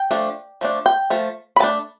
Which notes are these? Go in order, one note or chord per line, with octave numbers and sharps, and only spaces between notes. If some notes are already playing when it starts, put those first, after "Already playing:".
Already playing: G5
F3 A3 D4
F3 A3 D4
G5
F3 A3
B5
F3 A3 D4 A5